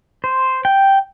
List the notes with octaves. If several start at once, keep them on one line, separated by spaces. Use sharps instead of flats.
C5
G5